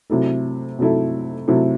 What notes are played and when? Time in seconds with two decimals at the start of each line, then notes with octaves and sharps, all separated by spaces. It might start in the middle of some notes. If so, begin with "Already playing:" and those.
0.10 C3 F#3 A3 E4 A4
0.79 C3 F#3 A3 E4 A4
1.48 C3 F#3 A3 E4 A4